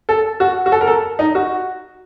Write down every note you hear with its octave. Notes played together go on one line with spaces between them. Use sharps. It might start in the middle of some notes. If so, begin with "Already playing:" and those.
A4
F#4
F#4
A4
A#4
A4
D#4
F#4